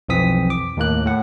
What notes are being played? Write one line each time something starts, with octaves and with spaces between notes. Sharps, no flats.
B1 F2 E3 C4 D#6 B6
D6
D#2 A2 A#3 F#6
A2 F#5